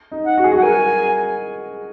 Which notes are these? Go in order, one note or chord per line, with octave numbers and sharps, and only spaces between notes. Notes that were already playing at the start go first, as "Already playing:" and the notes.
D#4
F#5
F#4
G#4
F#4 F#5
A#4 G#5